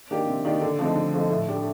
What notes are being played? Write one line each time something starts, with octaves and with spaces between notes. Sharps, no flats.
D#3 A#3 D4 G4
C3
D#3 A#3 D4 G4
D3
F3 A3 C4 D#4
D3
F3 A3 C4 D#4
A2
A3 D4 G4